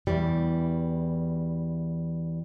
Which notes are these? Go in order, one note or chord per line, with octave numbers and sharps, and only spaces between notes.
E2 E3 G3